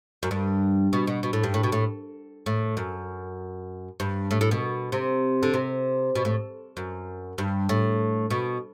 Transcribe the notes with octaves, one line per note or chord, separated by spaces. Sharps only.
F#2
G2
B2
B2
B2
A2
G2
A2
B2
A2
A2
F#2
G2
A2
A2
B2
C3
D3
C3
B2
A2
F#2
G2
A2
B2